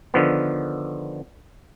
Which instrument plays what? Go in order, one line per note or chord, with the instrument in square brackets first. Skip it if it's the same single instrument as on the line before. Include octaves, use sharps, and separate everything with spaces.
[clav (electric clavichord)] D3 D#3 F3 B3